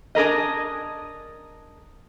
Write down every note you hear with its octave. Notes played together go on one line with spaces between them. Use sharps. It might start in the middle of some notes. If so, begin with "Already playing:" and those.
D4 G#4 A#4 D#5